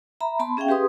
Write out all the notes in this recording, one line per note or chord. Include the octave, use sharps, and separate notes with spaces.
E5 A#5 B5
B3 A5 B5 C6
C#4 G#4 E5 F5 G5
G4 G#4 B4 C6 D#6